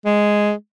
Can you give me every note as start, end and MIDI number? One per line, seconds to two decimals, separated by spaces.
0.06 0.52 56